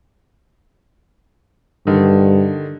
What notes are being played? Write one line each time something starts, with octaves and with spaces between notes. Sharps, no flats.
G2 D3 D#3